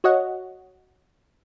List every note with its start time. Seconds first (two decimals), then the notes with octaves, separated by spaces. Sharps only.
0.04 F#4 C#5 D#5 F#5